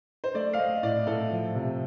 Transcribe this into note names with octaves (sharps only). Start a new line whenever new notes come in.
C5
A3 D5
F5
A3 D#5
A2 D5
A2 A4
F3
C3